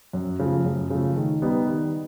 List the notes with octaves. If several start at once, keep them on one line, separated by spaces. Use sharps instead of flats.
F#2
C#3 F3 A3
F#2
C#3 F3 A3
D#3
G3 B3 D#4
D#3